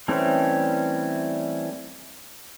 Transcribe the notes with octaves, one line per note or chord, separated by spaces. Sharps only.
E3 G3 A3 C4 C#4